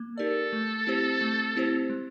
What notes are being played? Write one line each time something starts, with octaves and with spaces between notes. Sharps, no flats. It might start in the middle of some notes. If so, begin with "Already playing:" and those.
Already playing: A#3
D#4 G4 A4 A#4 D5
A3
C4 E4 G4 C5
A3
C4 E4 G4 C5
G#3